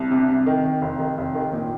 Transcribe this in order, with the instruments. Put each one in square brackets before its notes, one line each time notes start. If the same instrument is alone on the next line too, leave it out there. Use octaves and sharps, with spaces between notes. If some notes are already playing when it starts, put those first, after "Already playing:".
Already playing: [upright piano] C2
C3
C3
D#3
D#3
F1
D#3
F1
D#3
A#2